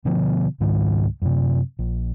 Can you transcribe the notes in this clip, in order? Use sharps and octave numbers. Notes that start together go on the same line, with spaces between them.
B2 D3 F3 B3
C#2 G#2 D#3
F#2 C3
A#1